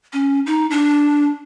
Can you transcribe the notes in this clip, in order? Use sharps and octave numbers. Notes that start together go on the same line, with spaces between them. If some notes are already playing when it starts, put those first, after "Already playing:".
C#4
D#4
D4